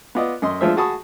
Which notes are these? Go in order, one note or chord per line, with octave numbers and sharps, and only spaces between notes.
B3 F4 D5 D#5
F#2 D#5 C6
F3 G#3 D4 F4 C5 E5
F#4 G#4 A5 B5 C#6 D#6